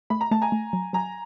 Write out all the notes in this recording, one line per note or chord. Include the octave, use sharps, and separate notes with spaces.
A3 B5
A#5
A3 A5
G#5 A#5
A3
F#3
F#3 G#5 A#5